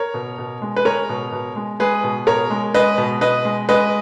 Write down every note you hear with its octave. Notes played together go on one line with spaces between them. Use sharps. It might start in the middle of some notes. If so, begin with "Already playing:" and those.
Already playing: A#4 C#5
B2
B2
G#3
B4
G#3 A#4 C#5
B2
B2
G#3
G#3 G#4 B4
B2
B2 A#4 C#5
G#3
G#3 B4 D#5
B2
B2 B4 D#5
G#3
G#3 B4 D#5